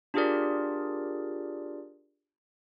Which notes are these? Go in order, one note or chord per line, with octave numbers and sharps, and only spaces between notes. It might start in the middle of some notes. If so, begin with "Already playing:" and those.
D4 F4 G4 G#4 A#4 D5